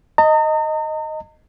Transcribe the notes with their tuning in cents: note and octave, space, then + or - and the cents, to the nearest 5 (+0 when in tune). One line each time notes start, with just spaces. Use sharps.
D#5 +0 A#5 -40